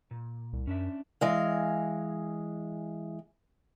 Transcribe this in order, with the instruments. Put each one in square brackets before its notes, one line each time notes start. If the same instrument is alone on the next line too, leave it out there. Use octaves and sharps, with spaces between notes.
[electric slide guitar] A#2
[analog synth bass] C2
[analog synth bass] F#2 [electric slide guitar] C#4 D4 E5
[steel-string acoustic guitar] E3 G#3 F5